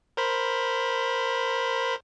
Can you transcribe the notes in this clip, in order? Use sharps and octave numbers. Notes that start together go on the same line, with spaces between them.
A#4 C5 B5